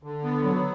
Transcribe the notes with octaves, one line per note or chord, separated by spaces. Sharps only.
D3
B3
F#3